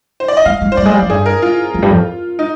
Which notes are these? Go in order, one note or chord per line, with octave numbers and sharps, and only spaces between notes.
C5
D5
D#5
G#3 F5
G#3
C5
G3 D5
G#3
G3
F3
G2 G#4
A#4
F4
F2
G2
F2
D#4